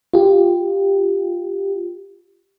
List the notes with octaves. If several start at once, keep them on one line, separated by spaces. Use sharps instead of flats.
F4 G4